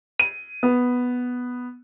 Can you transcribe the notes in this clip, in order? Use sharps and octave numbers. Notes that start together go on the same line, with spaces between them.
D#7
B3